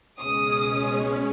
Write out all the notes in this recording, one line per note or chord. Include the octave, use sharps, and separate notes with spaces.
C#2 B2 G#3 C#4 D#6